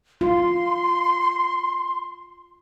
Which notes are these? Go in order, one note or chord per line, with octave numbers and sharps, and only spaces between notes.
F4 C6